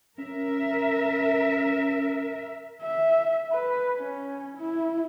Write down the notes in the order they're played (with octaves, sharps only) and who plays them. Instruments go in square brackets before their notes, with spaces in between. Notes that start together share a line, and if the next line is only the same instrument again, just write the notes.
[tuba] C#4 [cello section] A#4 E5
[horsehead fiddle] E5
B4
C#4
E4